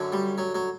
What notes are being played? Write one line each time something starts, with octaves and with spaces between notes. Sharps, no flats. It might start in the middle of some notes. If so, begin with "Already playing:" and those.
Already playing: F#2 D3 F#3
G3
F#3
F#3